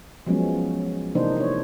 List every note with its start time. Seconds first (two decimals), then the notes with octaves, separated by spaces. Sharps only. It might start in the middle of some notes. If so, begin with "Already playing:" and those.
0.27 F3 F#3 G#3 B3 C#4
1.15 C3 E3 A#3 D4 D#4 C5
1.37 D4 C#5